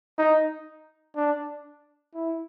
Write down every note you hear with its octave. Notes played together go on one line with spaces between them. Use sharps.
D#4
D4
E4